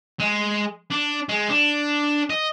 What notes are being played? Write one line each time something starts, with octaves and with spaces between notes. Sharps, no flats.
G#3
D4
G#3
D4
D#5